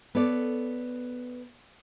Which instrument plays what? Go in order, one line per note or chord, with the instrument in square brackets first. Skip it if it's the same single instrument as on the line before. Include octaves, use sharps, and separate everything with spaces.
[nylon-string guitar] B3 A4 C#5 D5